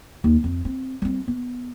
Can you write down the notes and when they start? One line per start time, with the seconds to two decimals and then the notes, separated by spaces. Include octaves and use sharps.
0.24 D#2
0.44 F2
0.65 C4
1.02 G3 C4
1.28 B3